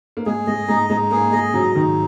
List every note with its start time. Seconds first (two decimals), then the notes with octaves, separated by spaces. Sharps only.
0.17 A#3
0.26 G#3 G#4
0.47 G#3 D#5
0.68 G#3 D#4
0.90 G#3 D#4
1.11 A#3 G#4
1.32 G#3 D#5
1.54 F#3 D#4
1.75 D#3 D#4